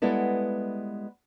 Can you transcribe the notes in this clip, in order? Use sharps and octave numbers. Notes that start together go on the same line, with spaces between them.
G3 G#3 B3 E4 A4 B4